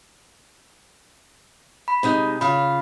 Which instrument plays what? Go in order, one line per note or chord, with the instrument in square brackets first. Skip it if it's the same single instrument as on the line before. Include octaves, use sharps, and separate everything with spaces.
[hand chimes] B5
[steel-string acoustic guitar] C3 G#3 D#4
[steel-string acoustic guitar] C#3 F4 F5 [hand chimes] B5